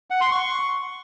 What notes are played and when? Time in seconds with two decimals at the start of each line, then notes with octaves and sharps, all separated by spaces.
0.10 F#5
0.21 C6
0.32 C#6